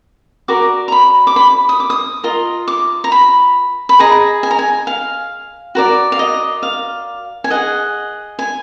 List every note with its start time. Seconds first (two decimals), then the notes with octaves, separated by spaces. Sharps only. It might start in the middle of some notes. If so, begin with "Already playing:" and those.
0.48 F#4 A#4 D5 D6
0.88 A#5
0.92 B5
1.27 D6
1.36 B5
1.69 D#6
1.80 D6
1.90 D#6
2.24 F4 A#4 D#5
2.68 D6
3.04 A#5
3.12 B5
3.89 B5
3.99 G#4 D#5 A#5
4.43 G#5
4.51 A#5
4.59 G#5
4.87 F5
5.75 F#4 A#4 D5
6.12 F5
6.19 D#5
6.63 F5
7.44 G#5
7.50 G#4 D#5 F#5
8.39 G#5